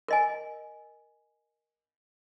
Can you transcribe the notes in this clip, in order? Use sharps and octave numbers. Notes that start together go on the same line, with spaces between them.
A#4 D#5 G#5